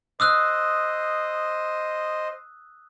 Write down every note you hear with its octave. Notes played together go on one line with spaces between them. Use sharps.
C5 D#5 D#6 E6 F#6